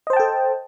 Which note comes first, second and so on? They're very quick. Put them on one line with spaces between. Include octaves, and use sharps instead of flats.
D#5 C5 A5 G5 A4